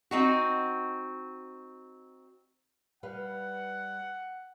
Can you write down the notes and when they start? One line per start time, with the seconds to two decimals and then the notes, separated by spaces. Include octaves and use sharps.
0.11 C4 D#4 F#4
3.03 G3 B4 F5 F#5